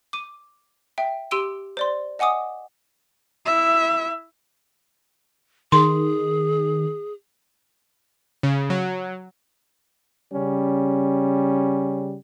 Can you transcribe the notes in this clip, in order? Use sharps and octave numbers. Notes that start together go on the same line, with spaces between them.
D6 D#7
E5 G5
G4 C6 E6 D7 D#7
C5 D5 C6
D#5 F#5 G#5 D6 D#6
E4 E5
D#3 G#4 C6
C#3
F#3
C#3 G3 C#4